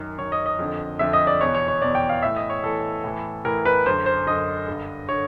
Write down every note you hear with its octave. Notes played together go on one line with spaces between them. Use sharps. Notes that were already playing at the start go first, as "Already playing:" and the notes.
Already playing: F#2 D#3
F#2 D#3 C#5
D#5
D#5
F2 D3
F2 D3 E5
D#5
D5
E2 B2 C#5
C#5
C#5
E2 B2 D5
G5
F5
A2 E3 E5
D#5
C#5
A2 E3 A4
A2 E3
A2 E3 A#4
B4
F#2 D3 C5
C5
F#2 D3 D#5
G2 D3
D3 C#5